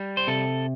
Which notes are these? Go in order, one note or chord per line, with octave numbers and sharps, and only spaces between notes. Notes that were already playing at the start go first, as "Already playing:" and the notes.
Already playing: G3
C5
C3 A4